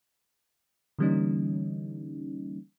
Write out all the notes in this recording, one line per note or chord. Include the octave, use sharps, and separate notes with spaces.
D3 E3 G3 A#3 C#4 D#4